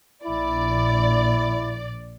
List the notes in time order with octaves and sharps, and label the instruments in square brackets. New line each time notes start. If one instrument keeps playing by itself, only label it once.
[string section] A#1 D5 [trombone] E4